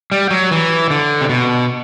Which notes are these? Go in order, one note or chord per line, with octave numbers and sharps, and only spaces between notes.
G3
F#3
E3
D3
C3
B2